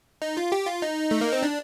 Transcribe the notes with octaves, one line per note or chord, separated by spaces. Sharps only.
D#4
F4
G4
F4
D#4
A3
A#3
C4
D4